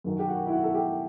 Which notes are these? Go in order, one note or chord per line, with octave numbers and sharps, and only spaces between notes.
F#2 D#3 F#3
G4
F#4
E4
F#4
A4
G4